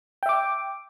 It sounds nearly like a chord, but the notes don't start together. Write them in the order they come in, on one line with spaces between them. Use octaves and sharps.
G5 E5 D6